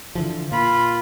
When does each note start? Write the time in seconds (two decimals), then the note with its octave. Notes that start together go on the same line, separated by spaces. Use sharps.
0.15 D3 E3 F3
0.52 A#2 F4 B5